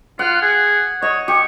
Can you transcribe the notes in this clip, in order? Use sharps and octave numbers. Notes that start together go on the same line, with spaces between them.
F4 F#5
G#4
C#5 D#5
G4 C#6